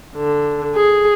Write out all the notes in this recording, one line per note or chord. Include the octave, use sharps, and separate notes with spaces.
D3
G#4